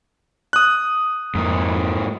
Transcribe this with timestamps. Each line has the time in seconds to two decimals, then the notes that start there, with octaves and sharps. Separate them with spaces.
0.53 D#6 F#6
1.35 F2 G#2 A#3